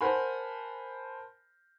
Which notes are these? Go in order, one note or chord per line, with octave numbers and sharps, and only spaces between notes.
A#4 C5 F#5 G#5 A5 B5